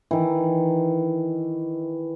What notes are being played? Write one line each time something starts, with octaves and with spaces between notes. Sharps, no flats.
D#3 E3